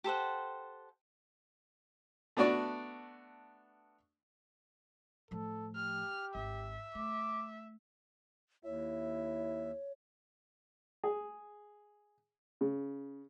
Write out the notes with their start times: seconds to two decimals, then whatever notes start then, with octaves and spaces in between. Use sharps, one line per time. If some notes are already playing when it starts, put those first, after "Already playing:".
0.04 G4 A4 C5 F#5
2.37 A3 B3 D4 F#4 D5
5.31 A2 F3 A4
5.76 G4 F6
6.35 G#1 E5
6.95 A3 D6
8.65 D#2 E4 C#5 E5
11.04 G#4
12.61 C#3